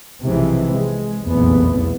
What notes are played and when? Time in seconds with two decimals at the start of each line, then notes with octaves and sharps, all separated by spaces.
0.25 B1 C3 E3 F3 G#3
0.73 G#3
1.26 F1 B1 E2 A#2 E3 B3